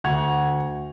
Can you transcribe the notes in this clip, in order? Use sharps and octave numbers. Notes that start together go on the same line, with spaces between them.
D2 F#5 C#6 G#6 F7